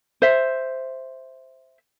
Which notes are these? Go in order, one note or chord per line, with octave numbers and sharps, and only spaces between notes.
C5 E5